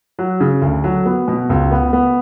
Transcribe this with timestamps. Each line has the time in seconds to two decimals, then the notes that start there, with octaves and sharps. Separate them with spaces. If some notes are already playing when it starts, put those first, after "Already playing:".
0.19 F#3
0.40 C#3
0.62 D2
0.84 F#3
1.06 B3
1.28 B2
1.49 C#2
1.72 B3
1.93 B3